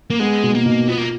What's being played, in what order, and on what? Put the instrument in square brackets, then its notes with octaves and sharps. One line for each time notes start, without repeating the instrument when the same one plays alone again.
[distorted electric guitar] A#3
[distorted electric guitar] G#3 [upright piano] B3
[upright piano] B2
[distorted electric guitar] A#3
[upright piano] B2
[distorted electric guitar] B3 [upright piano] F4
[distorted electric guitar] A#3